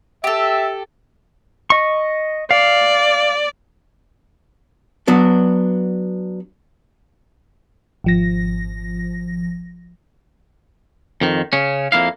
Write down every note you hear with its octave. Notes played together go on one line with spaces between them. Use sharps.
G4 A4 E5
D#5 C#6
D5 F5
F#3 B3 D4
G#1 F3 A#6
F2 D#3
C#3 C#4
F2 A#3 E4 F5